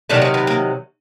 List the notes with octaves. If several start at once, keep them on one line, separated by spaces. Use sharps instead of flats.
C3 D#3 F#3 A3 D4
C#4
B3
A#3